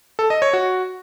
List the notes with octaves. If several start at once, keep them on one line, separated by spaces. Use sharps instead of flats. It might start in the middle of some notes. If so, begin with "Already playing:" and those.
A4
D#5
C#5
F#4